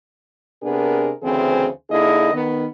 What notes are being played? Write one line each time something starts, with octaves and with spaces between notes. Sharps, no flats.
C3 B3 D4 G#4 A#4
D2 C#3 E3 C4 G#4 C5
D3 A#3 D#4 E4 G#4 D#5
D#3 B3